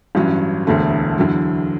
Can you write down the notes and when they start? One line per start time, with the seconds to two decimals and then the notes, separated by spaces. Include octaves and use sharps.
0.15 A1 G2 F#3 C#4
0.67 E1 D2 D3 A3
1.18 E2 D3 F#3